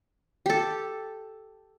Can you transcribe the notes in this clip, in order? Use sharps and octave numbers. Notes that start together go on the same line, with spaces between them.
G4 A4